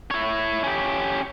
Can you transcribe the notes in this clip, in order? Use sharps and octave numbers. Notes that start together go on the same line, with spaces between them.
E4 C#5
C#4 G4